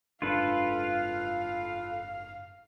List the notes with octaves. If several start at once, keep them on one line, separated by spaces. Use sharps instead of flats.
F#1 G#2 D4 F4 A4 B4 F5